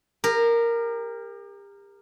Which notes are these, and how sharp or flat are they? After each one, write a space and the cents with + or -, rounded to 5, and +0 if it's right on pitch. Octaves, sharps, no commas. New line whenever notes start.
G4 +40 A#4 -5